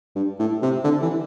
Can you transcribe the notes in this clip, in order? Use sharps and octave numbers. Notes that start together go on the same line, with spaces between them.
G2
A2
C3
D3
E3